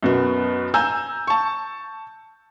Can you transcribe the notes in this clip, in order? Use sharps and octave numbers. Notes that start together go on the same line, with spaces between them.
F#2 B2 B3
G#5 A#5 E6 G6
A5 C#6